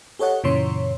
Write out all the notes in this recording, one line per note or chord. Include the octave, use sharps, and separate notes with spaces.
G4 A4 C#5 D#5 F#5
F#2 A#2 C#3 E3 C#5 C6